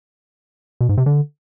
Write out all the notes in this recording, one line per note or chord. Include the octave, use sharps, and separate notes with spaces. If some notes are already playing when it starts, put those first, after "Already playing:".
B2
G#2
C3
D3